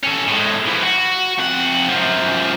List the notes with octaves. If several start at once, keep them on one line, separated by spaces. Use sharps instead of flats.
C#4 A4
A2 G#3
E3 F3
F#4
F2 F#5
F#2 F3